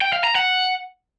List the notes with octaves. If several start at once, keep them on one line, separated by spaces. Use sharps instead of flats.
G5
F5
A#5
F#5